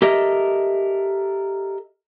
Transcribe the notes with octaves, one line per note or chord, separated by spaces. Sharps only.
G4 A4 A#4 D#5 E5